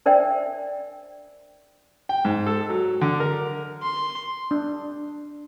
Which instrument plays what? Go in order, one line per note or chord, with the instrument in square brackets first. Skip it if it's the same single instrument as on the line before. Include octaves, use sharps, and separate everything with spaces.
[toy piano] D4 A#4 C5 D5 E5 G5
[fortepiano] G5
G#2
A4
F#3
D3
A#4
[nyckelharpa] C6
[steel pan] D4